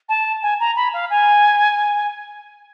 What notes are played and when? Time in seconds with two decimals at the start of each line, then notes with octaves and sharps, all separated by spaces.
0.09 A5
0.42 G#5
0.60 A#5
0.76 B5
0.94 F5
1.10 G#5